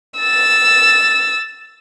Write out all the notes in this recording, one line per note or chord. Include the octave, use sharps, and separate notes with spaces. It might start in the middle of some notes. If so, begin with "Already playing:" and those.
E6 A6